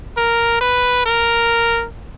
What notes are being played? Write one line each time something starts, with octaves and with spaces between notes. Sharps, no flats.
A#4
B4
A#4